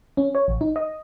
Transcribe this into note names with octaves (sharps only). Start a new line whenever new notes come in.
C#4
C#5
A1
D#4
D#5